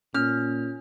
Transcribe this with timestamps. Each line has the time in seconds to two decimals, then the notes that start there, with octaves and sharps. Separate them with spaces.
0.14 A#2 C#4 F6